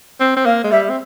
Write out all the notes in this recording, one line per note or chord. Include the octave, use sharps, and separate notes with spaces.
C4
C4
A#3 F5
G#3
G3 E5
C4